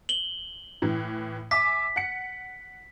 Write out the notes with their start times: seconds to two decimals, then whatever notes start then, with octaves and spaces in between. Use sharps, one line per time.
0.09 F#7 G7
0.82 A2 E3
1.51 E5 G#5 D6 B6
1.96 F#5 C#7